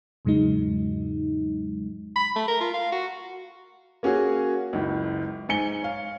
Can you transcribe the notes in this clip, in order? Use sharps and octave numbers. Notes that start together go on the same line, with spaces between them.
E2 G#2 C#3 F#3 G#3 D#4
B5
A3
A#4
F4
F5
F#4
A#3 C#4 F#4 G#4
F#1 C#2
G#2 G#5 C#7 G7
C#5 F5